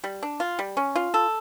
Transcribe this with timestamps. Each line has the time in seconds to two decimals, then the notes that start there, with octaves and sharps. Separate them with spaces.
0.04 G3
0.23 D4
0.40 F4
0.59 G3
0.77 C#4
0.95 F4
1.14 A4